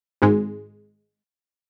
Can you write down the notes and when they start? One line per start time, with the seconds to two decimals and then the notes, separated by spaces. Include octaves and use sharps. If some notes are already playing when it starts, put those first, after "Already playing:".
0.22 G#1 G#2 G#3